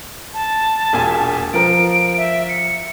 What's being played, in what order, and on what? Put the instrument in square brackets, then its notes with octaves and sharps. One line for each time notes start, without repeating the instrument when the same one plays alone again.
[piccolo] A5
[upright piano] E1 A#2 G#5
[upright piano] F3 A#4 [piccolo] D7
[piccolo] E5
C#7